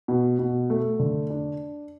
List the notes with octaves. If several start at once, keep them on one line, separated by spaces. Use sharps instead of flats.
B2
B2
A3
D3
D4